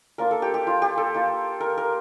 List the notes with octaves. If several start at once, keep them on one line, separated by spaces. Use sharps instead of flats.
A#3 D4 F4 A#4
A4
G4
G4
F4
G4
A4
A#3 F4
A#4
A#4